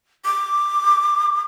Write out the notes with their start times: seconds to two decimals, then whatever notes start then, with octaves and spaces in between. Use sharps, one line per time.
0.25 D6